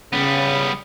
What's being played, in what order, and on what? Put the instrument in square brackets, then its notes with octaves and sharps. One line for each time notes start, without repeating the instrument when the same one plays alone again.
[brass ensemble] C#3 [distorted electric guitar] G3 B3